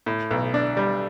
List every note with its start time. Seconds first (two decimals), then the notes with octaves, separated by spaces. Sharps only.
0.06 A2
0.31 B1
0.54 D4
0.77 G3